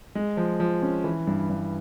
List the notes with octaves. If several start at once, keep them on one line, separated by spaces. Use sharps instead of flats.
G#3
F3
F3
C#4
E3
G2
G2